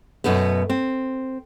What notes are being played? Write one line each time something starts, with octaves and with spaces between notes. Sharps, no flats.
F#2 B2 A3 B3
C4